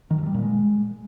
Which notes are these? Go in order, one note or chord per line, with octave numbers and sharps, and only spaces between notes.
D#3
G2
G3
A#2
G#3